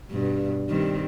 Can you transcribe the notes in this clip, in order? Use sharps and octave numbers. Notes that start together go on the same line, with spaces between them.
G2 B2
D#3 G3 C4